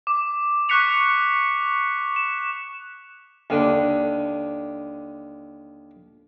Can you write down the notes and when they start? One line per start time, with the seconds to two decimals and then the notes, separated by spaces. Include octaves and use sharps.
0.07 D6
0.69 C#6 D6 F#6 B6 C#7 F7
2.16 E7
3.50 D#2 D3